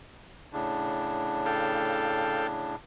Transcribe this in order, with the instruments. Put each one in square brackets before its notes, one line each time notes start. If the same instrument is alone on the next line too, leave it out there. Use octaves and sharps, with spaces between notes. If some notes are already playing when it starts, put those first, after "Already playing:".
[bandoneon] A2 C#3 D4
[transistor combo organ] A4 F5 G5